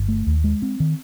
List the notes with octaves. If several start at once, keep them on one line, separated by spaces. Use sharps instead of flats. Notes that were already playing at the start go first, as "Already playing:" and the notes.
Already playing: G1
A3
D#2
G#3
C4
D#3